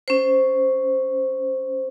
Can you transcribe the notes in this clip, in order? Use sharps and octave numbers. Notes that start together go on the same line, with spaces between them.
C#4 C5